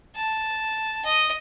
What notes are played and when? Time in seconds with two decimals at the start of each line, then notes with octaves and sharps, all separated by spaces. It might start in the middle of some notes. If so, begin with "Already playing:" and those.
0.16 A5
1.05 D#5